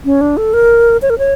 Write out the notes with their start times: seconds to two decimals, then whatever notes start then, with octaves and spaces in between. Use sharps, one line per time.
0.05 C#4
0.21 D4
0.37 A4
0.53 A#4
1.02 C#5
1.10 A#4
1.19 C#5